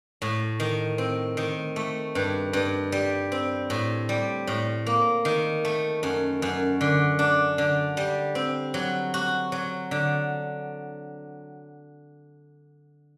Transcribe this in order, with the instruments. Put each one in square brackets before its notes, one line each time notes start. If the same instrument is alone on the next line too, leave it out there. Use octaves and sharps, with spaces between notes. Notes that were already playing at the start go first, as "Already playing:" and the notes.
[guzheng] A2
D#3
C4
D#3
A3
G2
G2
G3
C4
A2
G3
A2
A#3
D#3
A3
F#2
F#2
D3
D4
D3
G3
C4
F#3
F#4
F#3
D3